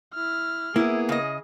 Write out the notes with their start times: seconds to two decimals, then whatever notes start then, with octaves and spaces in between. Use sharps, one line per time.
0.14 E4 F6
0.76 A#3 B3 E4 G#4
1.09 C#3 D#5